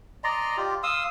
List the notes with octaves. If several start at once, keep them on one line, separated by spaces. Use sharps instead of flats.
D5 D#5 A#5 C6
F4 G4
F5 C6 D#6 E6